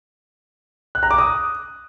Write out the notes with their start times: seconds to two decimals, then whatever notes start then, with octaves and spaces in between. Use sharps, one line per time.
0.95 F#6
1.03 A#5
1.11 D6
1.18 D#6